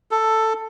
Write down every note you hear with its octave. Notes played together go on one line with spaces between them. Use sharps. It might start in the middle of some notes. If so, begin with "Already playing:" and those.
A4